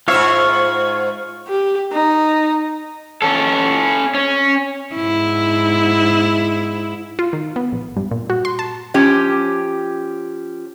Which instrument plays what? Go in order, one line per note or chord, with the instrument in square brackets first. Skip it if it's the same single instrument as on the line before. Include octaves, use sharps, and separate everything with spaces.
[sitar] G#2 C5 E5 [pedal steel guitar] F4 C#5 F5 [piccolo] C#6
[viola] G4
D#4
[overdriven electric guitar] C#4 A4
C#4
[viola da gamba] G#2 E4
[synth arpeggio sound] F4
D#3
B3
A#1
G2
A#2
F#4
C6
A5
[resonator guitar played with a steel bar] F3 C#4 G4